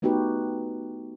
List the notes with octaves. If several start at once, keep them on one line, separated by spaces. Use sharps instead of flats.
A3 B3 D#4 F#4 G4 B4